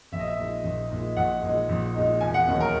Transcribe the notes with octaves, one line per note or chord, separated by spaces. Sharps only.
A#1 E5
D#5
E5
A#2 G#3 D#4
A#1
A#2 G#3 D#4
A#1 F#5
A#2 G#3 D#4
A#1
A#2 G#3 D#4
E1 G#5
F#5
D#2 D#3 F#3
A#4